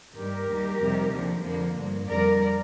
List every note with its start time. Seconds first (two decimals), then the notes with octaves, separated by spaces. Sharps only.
0.15 G2 D#3 G3 A#3 G4 A#4
0.47 D#2 D#3 G3 A#3
0.79 F2 C3 D#3 G3 A#3
1.12 D#2 D3 F3
1.44 F2 D3 F3 A#3
1.76 G2 F3 A#3
2.08 F2 D3 G3 A#3 A#4 D5